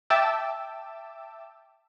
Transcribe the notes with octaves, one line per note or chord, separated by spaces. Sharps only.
E5 G5 A5 D6 E6